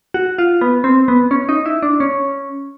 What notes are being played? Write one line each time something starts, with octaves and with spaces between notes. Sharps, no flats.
F#4
F4
B3
C4
B3
C#4
D#4
E4
D4
C#4